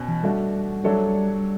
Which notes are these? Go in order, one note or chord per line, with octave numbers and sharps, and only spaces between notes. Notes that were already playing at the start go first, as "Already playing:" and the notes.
Already playing: B2 C#4
E3
G3 A3 D4 F#4
F#3 G3 A3 D4 A4 C#5
G3